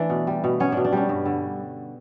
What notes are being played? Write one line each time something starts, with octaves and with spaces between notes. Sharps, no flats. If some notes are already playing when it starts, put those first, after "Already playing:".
Already playing: E3 A3 D4 D5
B2
G3
B2
B3 C#4 C#5
B2 D4
D4
G3 C#4
G2
D3